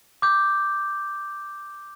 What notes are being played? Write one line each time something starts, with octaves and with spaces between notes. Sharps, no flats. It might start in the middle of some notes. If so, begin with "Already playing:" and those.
D6 G6